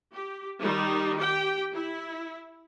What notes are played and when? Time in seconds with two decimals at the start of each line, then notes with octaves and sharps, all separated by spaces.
0.12 G4
0.60 D#3 G3 D#4
1.17 G4 G5
1.73 E4